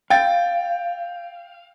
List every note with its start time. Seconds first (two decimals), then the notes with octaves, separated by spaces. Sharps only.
0.10 F5 G5 A6